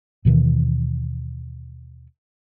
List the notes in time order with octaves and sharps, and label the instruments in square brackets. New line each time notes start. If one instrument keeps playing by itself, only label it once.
[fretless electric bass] D#2 B2 D#3 E3